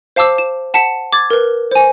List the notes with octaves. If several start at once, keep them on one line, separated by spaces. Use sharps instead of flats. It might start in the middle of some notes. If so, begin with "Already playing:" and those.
C5 F5 A5 D6 E6
E7
F#5 A5 B6 C#7 E7
D6 G#6 A6
A#4 B4
C5 G#5